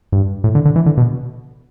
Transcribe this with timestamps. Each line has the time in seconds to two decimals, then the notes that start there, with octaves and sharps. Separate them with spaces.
0.12 G2
0.44 A2
0.55 D3
0.65 D3
0.76 E3
0.86 D3
0.97 B2